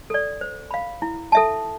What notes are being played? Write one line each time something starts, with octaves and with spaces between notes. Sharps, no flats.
A4 D5
C5
F5 B5
E4
A4 E5 A5